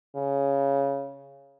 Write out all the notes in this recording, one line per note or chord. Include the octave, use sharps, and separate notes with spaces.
C#3